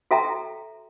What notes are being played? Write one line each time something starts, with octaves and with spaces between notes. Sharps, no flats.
F#4 A4 E5 G5 A#5